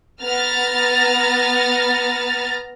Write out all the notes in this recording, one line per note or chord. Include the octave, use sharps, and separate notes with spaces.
B3 A#5 F6 A6